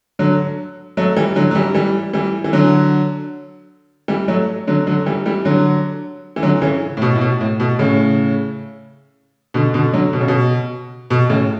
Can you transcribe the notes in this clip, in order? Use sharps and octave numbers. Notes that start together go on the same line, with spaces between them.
D3 F#3
F#3 A3
E3 G3
D3 F#3
F#3
E3 G3
E3 G3
E3 G3
E3
D3 F#3
E3 G3
F#3 A3
D3 F#3
D3 F#3
E3 G3
E3 G3
D3 F#3
E3
D3 F#3
C#3 E3
A2
B2
A2
B2
A2
B2
A2 C#3
B2 D3
B2 D3
D3 F#3
B2
C#3
B2
B2
A2 C#3